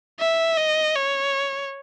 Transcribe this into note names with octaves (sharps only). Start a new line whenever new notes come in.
E5
D#5
C#5